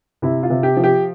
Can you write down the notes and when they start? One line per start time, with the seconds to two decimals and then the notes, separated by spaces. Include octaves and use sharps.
0.22 C3 E4
0.43 F4
0.50 C3
0.63 G4
0.77 F3
0.84 G4